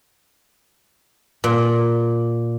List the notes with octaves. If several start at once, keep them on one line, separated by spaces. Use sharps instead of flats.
A#2